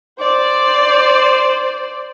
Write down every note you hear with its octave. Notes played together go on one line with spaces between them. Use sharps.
C5 D5